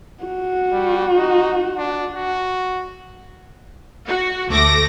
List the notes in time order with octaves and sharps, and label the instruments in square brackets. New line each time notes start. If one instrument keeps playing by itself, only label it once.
[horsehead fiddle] F#4
[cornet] G3
D#4
D4
F#4
[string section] F#4
D2 A3 D6 A#6